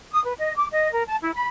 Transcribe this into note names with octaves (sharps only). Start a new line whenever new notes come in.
D#6
B4
D#5
D6
D#5
A#4
A5
E4
B5